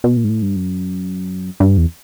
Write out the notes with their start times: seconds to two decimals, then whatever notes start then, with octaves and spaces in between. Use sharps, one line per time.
0.04 B2
0.17 A#2
0.24 G#2
0.29 A2
0.42 G2
0.56 F#2
1.60 G2
1.78 E2